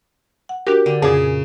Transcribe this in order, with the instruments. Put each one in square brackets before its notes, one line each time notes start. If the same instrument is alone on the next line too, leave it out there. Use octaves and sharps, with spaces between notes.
[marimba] F#5
[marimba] D4 F#4 A#4 [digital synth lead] G4
[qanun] D3
[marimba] F2 A#2 [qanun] C#3 [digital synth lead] G#4